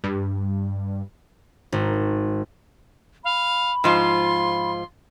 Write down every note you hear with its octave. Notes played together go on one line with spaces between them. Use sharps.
G2
G#1
F5 B5
G#2 F3 F4 C6